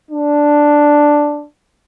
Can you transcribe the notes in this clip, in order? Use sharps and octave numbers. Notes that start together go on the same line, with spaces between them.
D4